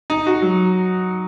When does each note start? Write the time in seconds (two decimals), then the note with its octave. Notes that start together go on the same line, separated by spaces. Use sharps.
0.10 D#4
0.27 F#4
0.42 F#3